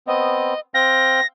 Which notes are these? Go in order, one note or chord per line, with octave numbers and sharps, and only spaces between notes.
B3 C4 D#5
C4 F5 G5 A#6